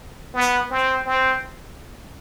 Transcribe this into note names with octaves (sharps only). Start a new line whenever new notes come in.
B3
C4
C4